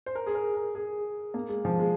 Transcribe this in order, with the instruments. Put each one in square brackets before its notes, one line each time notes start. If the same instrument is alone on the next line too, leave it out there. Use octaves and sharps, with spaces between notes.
[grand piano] C5
A#4
G#4
A#4
A#4
G#4
A#3
G#3
F3
G#3